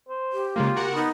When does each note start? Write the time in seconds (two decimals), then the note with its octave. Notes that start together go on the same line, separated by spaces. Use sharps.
0.09 C5
0.32 G4
0.56 C#3 G#3 A#3 F4
0.76 F#4 A#4 F#5
0.94 B3 D#4